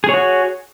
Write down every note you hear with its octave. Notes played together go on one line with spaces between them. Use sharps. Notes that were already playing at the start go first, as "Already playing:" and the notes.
F#4 G#4 C#5